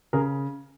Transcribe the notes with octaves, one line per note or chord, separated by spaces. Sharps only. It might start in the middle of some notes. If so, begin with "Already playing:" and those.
C#3 G#4 A#4